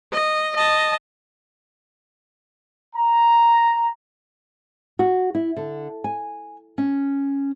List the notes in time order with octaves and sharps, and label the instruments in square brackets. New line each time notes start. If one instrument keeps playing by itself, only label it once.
[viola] D#5
D#5 A5
[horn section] A#5
[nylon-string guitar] F#4
E4
D3
G#5
C#4